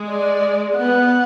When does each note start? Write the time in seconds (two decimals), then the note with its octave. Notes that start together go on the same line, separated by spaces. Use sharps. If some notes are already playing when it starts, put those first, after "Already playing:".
Already playing: G#3
0.09 D5
0.77 B3 F#5